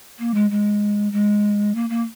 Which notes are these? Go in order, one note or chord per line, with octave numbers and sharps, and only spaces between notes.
A#3
G#3
G#3
G#3
A#3
A#3